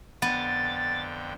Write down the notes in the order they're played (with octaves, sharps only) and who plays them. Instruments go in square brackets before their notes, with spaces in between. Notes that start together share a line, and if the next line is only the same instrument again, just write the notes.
[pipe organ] F2 D3 G5 [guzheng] B3 [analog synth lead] A6